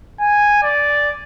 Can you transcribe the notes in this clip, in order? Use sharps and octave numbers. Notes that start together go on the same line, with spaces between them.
G#5
D5